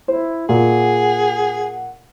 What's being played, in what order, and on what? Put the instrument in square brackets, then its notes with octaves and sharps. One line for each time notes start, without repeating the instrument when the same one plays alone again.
[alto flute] E4 [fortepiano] C5
[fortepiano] A#2 [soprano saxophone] G#4 [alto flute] F#5